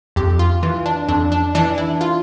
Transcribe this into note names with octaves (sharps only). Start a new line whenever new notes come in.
F2 G4
F4
E3 F4
D4
F2 D4
D4
E3 D4
E4
F4